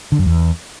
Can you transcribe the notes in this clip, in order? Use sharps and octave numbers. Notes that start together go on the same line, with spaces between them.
D3
F#2
E2